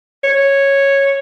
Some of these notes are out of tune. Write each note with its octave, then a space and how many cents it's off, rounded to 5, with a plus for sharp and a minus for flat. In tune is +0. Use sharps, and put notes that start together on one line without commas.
C#5 -5